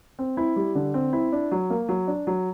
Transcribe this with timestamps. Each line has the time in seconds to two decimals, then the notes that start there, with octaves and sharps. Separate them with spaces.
0.19 C4
0.37 E4
0.56 G3
0.75 D3
0.94 C4
1.13 E4
1.32 D4
1.51 F#3
1.70 A#3
1.89 F#3
2.07 D4
2.27 F#3